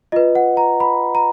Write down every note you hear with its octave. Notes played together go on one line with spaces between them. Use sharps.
F4 B4 D#5
F#5
A#5
B5
A#5